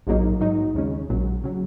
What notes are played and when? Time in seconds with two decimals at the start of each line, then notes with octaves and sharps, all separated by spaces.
0.07 A#1 G#2 F#3 A#3 D#4
0.41 G#2 F#3 D#4
0.74 D#2 C#3 G#3 C#4
1.09 A#1 A#2 F#3
1.44 C#3 F#3